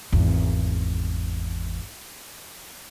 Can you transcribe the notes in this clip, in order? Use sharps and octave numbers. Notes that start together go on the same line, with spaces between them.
G#1 E2